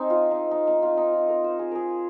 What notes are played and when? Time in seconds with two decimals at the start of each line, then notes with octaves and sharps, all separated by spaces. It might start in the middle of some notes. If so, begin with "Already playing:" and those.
Already playing: C4 D#4 G#4
0.10 F4
0.31 D#4
0.51 D#4
0.67 D#4
0.82 F4
0.97 D#4
1.13 F4
1.28 A#4
1.44 C5
1.59 G#4
1.71 G#4 A#4